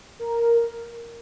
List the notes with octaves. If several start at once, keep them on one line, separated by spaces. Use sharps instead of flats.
A#4